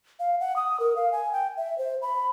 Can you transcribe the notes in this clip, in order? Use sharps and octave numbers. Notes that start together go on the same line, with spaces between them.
F5
F#5
D#6
A#4
F5
G#5
G5
E5
C5
B5